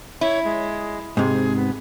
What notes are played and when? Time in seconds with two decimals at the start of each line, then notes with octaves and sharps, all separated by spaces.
0.21 E4 C#5
0.44 G#3
1.17 G#2 C3 G#4
1.56 B3